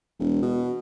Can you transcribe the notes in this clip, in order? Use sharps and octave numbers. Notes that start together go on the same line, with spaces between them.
E1
B2